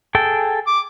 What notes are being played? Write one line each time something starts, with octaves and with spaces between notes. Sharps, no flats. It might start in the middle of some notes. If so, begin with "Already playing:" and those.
G#4 A4 G5
D6